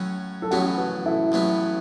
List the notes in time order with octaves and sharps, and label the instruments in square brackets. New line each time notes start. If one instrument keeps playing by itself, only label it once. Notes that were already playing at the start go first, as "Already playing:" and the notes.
Already playing: [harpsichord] A2 F#3 C#4
[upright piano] A4
[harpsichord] A1 A2 F#3 B3 [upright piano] C#4 F#4
[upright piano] F#4 B4
E4 A4
[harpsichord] A1 A2 F#3 B3